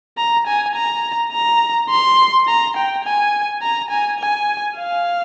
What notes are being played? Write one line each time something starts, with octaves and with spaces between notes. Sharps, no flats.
A#5
G#5
A#5
A#5
C6
A#5
G5
G#5
A#5
G#5
G#5
F5